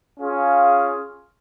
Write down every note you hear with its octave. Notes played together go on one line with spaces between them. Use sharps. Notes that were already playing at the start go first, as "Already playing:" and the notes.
C#4 F4 G#4 F5